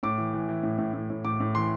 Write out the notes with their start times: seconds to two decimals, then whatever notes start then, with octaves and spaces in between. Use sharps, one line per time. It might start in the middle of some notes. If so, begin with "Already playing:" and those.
0.03 A2 D6
0.18 E3
0.34 E3
0.49 E3
0.63 A2
0.78 A2
0.94 A2
1.10 A2
1.24 A2 D6
1.40 A2
1.55 E3 C6